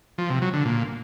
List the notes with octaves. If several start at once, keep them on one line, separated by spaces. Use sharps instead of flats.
F3
C3
F#3
D3
A#2